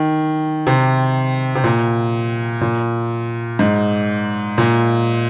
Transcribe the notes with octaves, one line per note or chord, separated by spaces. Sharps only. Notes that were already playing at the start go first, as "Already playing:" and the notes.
Already playing: D#3
C3
C3
A#2
A#2
G#2
A#2